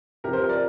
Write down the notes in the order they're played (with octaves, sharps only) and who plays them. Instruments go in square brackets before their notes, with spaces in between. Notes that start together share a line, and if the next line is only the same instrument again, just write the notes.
[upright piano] C3 G4 A#4
F3
C5
G4 A#4
A#4 D5